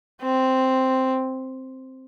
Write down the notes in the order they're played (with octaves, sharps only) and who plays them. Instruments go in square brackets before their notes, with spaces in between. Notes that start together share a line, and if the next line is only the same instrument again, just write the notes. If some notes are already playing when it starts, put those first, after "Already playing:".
[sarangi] C4